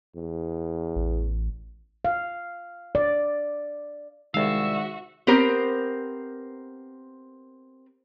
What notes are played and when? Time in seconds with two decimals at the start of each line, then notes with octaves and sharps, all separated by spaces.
0.16 E2
0.96 A1
2.05 F5
2.95 D5
4.34 C2 D#3 G#3 F#4 G#4 E5 F5 E6
5.27 B3 C4 G4 A#4 C5